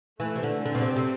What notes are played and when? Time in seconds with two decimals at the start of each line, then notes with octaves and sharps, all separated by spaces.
0.20 E3 A3
0.35 C3
0.43 D3
0.65 D3 C4
0.75 B2
0.81 C3
0.96 C3